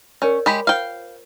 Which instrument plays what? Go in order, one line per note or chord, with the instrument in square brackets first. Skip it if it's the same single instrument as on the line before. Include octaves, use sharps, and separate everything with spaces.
[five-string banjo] C#4 [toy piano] A#4 C#5 D5
[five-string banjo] G#3 G4 B5
[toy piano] F4 C5 [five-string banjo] F5 G5